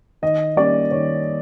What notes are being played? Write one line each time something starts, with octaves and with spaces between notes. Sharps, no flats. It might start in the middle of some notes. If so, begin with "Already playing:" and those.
D#3 D#5
G3 A#3 C#4 D5
D#3 C#5